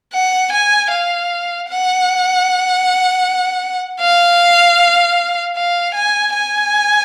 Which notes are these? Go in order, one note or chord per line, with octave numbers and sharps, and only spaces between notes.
F#5
G#5
F5
F#5
F5
F5
G#5
G#5